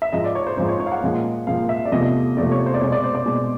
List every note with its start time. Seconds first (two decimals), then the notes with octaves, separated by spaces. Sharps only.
0.02 E5
0.13 G#2 F3 G#3 D#5
0.24 D5
0.35 C#5
0.47 C5
0.57 G#2 F3 G#3 C5
0.69 C#5
0.80 C#5
0.87 F5
0.92 F#5
1.02 A#2 F3 G#3
1.47 A#2 F3 G#3 F5
1.69 E5
1.85 D5
1.92 E2 C3 F3 A3 D#5
2.36 E2 C3 F3 A3 D5
2.52 C#5
2.66 C5
2.74 D5
2.81 B2 G#3 C#5
2.92 D5
3.04 C5
3.15 D5
3.26 B2 G#3